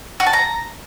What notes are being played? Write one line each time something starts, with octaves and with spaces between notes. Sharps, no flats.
F#4
A5
A#5